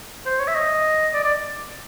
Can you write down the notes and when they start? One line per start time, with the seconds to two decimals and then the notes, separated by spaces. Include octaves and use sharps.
0.26 C5
0.40 C#5
0.48 E5
0.55 D#5
1.14 D5
1.24 D5